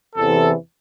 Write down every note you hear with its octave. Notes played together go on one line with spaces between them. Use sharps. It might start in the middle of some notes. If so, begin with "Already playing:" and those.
E2 C3 E3 A4